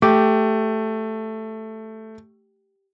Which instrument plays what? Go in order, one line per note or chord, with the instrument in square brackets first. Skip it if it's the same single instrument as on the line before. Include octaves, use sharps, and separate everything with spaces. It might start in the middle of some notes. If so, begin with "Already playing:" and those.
[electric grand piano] A3 [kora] G4